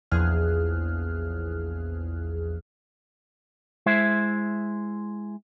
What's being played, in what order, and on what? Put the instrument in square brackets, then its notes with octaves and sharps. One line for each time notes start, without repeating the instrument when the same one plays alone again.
[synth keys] A#1 E2 F3 G#4 F6 F#6
[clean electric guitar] G#3 E4 C5 E5